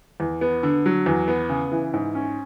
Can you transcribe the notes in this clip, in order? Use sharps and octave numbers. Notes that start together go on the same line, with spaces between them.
E2
B3
D3
F#3
E2
B3
C#3
E3
G#2
C#4